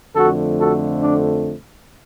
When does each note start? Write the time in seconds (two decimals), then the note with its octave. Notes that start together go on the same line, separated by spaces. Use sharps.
0.15 F2 D3 F3 A3 F#4 A4
0.59 F#4 A4
1.02 D4